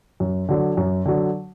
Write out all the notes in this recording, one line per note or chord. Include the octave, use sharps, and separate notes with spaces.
F#2
D3 F#3
F#2
D3 F#3